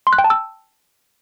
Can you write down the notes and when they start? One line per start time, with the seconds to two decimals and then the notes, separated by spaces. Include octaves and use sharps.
0.07 C6
0.13 F#6
0.18 G5
0.24 A5
0.30 E6